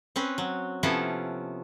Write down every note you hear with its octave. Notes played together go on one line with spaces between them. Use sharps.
C4 C#4 B4
F#3
C3 F3 B3 C#4 E4 A4